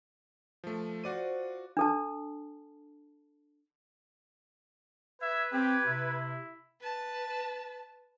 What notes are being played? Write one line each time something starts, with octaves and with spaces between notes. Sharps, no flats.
F3 A3
F4 F#4 C5 D5 D#7
D4 A4 A5
B4 E5 G#6
C4 G4 G#6
C3 E4
B4 A5